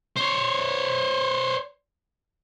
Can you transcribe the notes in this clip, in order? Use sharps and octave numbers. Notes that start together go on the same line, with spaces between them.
C5 C#5